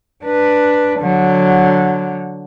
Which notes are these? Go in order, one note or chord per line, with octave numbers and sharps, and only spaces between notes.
D4 B4
D3 F#3